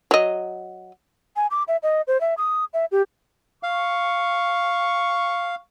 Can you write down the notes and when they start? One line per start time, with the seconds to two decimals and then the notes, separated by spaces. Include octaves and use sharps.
0.11 F#3 D#5
1.36 G#5
1.51 D6
1.68 E5
1.83 D#5
2.07 C5
2.21 E5
2.37 D#6
2.73 E5
2.91 G4
3.63 F5 C#6